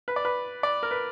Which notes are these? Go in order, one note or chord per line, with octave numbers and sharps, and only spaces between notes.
B4
D5
B4
D5
A#4
B4